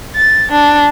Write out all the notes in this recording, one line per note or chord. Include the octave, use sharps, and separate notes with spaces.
A6
D4